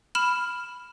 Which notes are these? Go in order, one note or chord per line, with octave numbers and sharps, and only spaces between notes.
B5 F6 E7